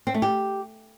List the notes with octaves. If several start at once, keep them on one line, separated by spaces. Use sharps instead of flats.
C4
A3
G4